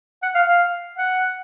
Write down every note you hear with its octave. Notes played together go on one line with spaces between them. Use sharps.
F#5
F5
F5
F#5